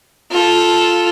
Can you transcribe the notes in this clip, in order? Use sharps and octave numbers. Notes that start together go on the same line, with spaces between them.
F4 A4